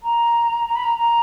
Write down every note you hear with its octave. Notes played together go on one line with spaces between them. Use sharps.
A#5
A#5
B5
A#5
A#5